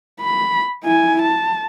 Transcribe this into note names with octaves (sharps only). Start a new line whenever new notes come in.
B5
E4 G#5
A5